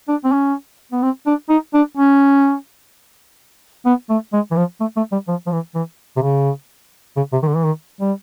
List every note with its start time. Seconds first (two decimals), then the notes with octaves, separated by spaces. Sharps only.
0.08 D4
0.24 C4
0.32 C#4
0.92 B3
1.03 C4
1.27 D4
1.49 D#4
1.74 D4
1.97 C#4
3.86 B3
4.10 A3
4.33 G#3
4.51 E3
4.56 F3
4.81 A3
4.97 A3
5.12 G3
5.28 F3
5.47 F3
5.52 E3
5.75 E3
6.16 C3
6.22 C#3
7.17 C#3
7.33 C3
7.43 D#3
7.48 D3
7.56 E3
7.64 D#3
8.01 G3